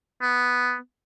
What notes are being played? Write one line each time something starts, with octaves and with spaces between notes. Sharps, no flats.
B3